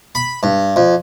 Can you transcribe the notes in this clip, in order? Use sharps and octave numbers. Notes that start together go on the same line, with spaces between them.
B5
G2
F2